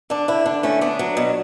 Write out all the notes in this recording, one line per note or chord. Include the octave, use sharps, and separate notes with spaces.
D3 D4
D3 E4
D3 D4
A3 C#4
B3 D4
F#3
B2